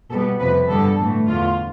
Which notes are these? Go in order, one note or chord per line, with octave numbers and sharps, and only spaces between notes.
B2 G3 B3 A4
F2 C3 F3 B3 B4
G2 D3 G3 B3 A4
A2 E3 A3
E2 D3 A3 F4